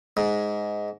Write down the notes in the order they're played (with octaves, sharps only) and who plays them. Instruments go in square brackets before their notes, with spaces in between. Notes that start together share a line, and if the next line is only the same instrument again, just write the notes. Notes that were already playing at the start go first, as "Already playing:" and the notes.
[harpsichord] G#2